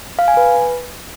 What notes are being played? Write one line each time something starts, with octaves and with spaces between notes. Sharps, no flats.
F5
G#5
B4